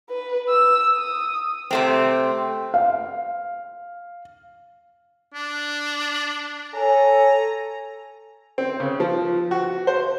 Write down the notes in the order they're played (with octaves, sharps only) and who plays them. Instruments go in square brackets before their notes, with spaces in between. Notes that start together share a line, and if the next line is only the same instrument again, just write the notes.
[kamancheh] B4
E6
D#6
[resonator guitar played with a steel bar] C3 A3 C4
[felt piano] F5
[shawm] D4
[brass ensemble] A4 C#5 G#5 [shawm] A#5
[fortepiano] C4
C#3
F3
F#4
C5